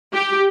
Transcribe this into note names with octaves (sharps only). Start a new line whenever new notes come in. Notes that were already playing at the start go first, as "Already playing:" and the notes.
G4